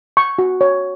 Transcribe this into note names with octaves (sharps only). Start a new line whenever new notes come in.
C#6
F#4
C#5